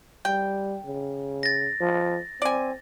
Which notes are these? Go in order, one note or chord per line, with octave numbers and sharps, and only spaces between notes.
G3 G5
C#3
A6 A#6
F3
C4 D5 G#5